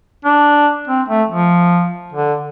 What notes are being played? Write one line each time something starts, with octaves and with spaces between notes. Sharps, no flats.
D4
C4
A3
F3
D3